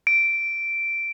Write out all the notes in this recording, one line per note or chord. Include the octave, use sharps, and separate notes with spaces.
D7